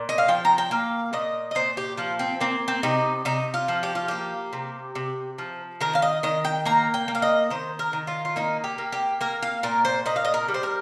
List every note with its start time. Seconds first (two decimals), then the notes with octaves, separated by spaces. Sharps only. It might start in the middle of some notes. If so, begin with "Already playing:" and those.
Already playing: A#2
0.09 D#5
0.18 F5
0.28 F3 G5
0.45 A#5
0.58 G5
0.71 A#3 F5
1.13 A#2 D#5
1.51 D#5
1.55 A#2 C5
1.77 G4
1.97 F3 F4
2.19 C4
2.41 A#3 C4
2.68 C4
2.83 C3 D#4
3.25 C3 D#4
3.54 F4
3.68 F3
3.83 G4
3.95 F4
4.08 A#3 G4
4.53 C3
4.95 C3
5.38 F3
5.81 D#3 A#4
5.95 F5
6.02 D#5
6.23 D#3 D#5
6.45 G5
6.65 A#3 A#5
6.94 G5
7.08 A#3
7.15 F5
7.22 D#5
7.51 D#3 C5
7.79 A#4
7.93 D#3
8.07 F4
8.25 F4
8.36 A#3 D#4
8.64 G4
8.78 A#3
8.92 G4
9.21 A#3 A#4
9.42 F5
9.63 A#2 A#4
9.85 C5
10.06 A#2 D#5
10.16 F5
10.25 D#5
10.34 A#4
10.48 G3
10.54 C5
10.63 A#4